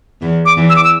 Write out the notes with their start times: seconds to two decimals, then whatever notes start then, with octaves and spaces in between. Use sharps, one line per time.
0.22 E2 E3
0.46 D6
0.57 E2 E3
0.69 E6
0.76 D6
0.84 E6